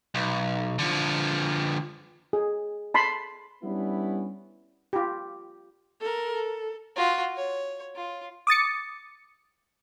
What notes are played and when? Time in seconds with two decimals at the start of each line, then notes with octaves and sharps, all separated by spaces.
0.15 B1
0.79 D3 F3
2.33 G#4
2.94 A5 B5 C6
3.63 G3 B3 C#4 D4 E4
4.93 F4 G4
6.00 A4 A#4
6.34 A4
6.96 F4 F#4
7.36 C#5
7.95 F4
8.47 D6 D#6 A6 C#7